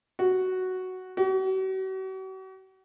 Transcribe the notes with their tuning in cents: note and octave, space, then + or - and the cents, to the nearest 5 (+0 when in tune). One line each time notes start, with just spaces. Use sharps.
F#4 +5
F#4 +45